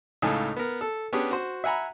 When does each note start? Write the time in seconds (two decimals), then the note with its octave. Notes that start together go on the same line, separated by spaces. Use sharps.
0.22 C#2 A2 C#3 D#4 A4 G#5
0.56 B3 A#4
0.81 A4
1.13 B3 C#4 D4 G4 G#4
1.31 F#4 C5
1.64 E5 F#5 G#5 A#5 B5